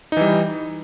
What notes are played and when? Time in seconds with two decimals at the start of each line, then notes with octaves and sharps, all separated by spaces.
0.12 D#4
0.17 E3
0.21 G3